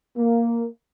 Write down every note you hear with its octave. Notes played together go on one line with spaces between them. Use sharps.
A#3